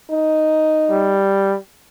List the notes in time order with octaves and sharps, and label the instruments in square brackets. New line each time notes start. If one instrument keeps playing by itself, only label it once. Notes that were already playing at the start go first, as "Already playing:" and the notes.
[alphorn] D#4
[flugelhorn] G3